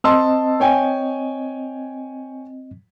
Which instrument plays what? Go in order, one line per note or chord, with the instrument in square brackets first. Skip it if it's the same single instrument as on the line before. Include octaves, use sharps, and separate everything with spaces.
[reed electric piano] C4 D#5 [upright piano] A5 C6 E6
[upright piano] C#5 G5 G#5